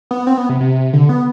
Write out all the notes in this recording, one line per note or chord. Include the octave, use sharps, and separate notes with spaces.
B3
C4
B3
C3
C3
D3
B3